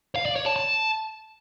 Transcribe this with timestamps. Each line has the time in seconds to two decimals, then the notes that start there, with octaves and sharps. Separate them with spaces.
0.16 F5
0.26 D5
0.36 C#5
0.46 A5
0.56 A5